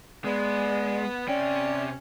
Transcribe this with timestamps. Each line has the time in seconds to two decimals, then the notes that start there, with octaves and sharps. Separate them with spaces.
0.25 G#3 B3 D5
1.28 C3 C#4 D5 G5